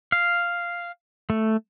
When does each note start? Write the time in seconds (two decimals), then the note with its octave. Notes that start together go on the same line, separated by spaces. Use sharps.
0.12 F5
1.30 A3